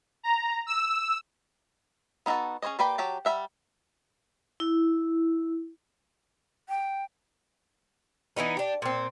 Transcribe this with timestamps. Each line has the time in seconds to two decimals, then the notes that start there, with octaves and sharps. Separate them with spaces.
0.23 A#5
0.67 E6
2.26 B3 D#4 E4 F#4 A4
2.62 C#4 G#4 C5 C#5 D#5
2.79 A#3 G4 B4 D5 G5
2.98 F#3 G4 A5
3.25 G3 A#4 E5 F#5
4.60 E4
6.69 G5
8.36 E3 G#3 B3 D#4
8.57 D4 G4
8.82 A#2 C4